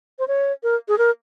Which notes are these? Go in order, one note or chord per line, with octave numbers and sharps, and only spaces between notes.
C5
C#5
A#4
G#4
A#4